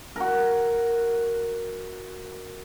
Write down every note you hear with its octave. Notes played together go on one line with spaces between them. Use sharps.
F#4 A#4